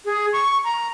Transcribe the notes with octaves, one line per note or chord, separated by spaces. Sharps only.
G#4
C#6
A#5